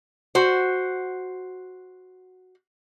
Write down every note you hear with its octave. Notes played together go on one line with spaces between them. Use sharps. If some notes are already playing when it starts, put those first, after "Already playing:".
F#4 C5